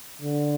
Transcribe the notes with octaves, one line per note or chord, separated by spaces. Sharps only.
D3